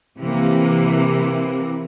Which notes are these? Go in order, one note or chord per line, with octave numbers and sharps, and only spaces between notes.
C3 E3 A#3